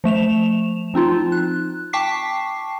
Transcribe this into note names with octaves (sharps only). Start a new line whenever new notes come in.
F3 A3 E7 F7
F3 C4 D#4 F4
F#6
G5 A5 C#6 D6 B6 C7